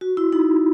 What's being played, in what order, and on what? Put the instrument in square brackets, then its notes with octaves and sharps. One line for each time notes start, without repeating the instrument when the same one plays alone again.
[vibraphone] F#4
E4
D#4